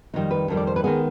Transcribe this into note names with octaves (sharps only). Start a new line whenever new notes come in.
F2 D#3 G3 D#4
B4
F2 D#3 G3
D5
C5
B4
D#3 G#3 B3 G#4